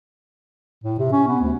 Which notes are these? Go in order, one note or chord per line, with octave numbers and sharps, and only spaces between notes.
A2
C3
C#4
B3
D2